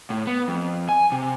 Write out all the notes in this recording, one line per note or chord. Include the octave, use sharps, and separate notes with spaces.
A2
B3
F2
G#5
C3